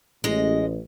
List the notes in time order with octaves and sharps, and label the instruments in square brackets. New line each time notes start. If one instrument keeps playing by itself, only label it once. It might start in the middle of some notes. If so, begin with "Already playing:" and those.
[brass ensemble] A1 [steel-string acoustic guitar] G#3 D#5